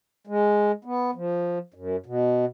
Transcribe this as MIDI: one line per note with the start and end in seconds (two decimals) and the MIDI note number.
0.27 0.72 56
0.85 1.11 59
1.15 1.58 53
1.74 1.96 42
2.06 2.45 47